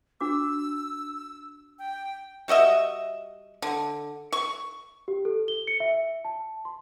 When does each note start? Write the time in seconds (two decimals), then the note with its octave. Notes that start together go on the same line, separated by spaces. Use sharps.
0.21 D4 F#4 D6 E6
1.79 G5
2.48 G3 F#4 D#5 E5
3.62 D3
4.32 C#6
5.08 G4
5.25 A4
5.48 G7
5.67 C#7
5.80 E5
6.25 A5
6.65 C6